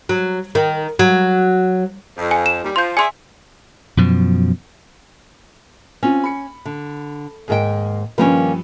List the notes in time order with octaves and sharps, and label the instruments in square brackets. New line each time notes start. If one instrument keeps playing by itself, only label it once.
[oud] F#3
D#3
F#3
[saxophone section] F2
[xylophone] G#5
E7
[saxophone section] D#2 G3
[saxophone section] F3 [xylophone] C6 G6
[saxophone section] G#4 D5 E5 [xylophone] G#5 C6
[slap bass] F#2 B2 F3
[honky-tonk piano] C4 F4 [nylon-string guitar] C#4
[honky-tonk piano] B5 C#7
[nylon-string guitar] D3
[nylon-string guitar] D#2 G#2 G5 [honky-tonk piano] G#4 A#4 D#5
[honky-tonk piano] G2 F3 B4 [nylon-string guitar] D#3 A#3 C#4